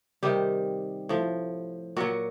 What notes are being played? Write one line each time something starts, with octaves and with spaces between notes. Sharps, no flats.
C3 D#3 G3 G4
A2 F3
A#2 F#3 F#4